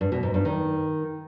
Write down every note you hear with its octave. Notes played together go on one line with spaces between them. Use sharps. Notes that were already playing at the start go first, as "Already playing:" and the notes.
G2
B2
G#2
G2
D#3